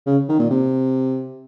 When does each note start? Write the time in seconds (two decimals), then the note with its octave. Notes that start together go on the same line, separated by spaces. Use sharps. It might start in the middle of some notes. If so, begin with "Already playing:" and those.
0.06 C#3
0.29 D#3
0.39 A#2
0.50 C3